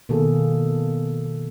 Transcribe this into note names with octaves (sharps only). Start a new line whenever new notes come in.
B2 D#3 A#3 G#4 A4